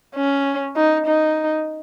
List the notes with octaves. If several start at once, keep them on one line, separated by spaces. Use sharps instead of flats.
C#4
D#4
D#4